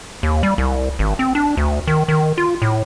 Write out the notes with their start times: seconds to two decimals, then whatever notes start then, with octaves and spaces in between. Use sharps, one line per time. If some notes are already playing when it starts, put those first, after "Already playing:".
0.23 D#2
0.43 G3
0.58 C2
0.99 G#1
1.19 C4
1.35 D4
1.57 D2
1.87 D#3
2.08 D#3
2.38 F4
2.62 A2